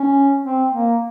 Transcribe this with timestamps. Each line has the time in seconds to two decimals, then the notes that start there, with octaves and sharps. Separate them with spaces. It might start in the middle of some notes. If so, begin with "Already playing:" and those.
Already playing: C#4
0.44 C4
0.72 A#3